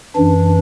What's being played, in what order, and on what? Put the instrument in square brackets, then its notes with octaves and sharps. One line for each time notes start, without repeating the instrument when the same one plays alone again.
[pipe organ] F#2 E3 D4